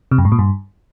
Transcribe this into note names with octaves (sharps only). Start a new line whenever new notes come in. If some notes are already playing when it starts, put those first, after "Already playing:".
C3
F#2
G#2
A#2
G2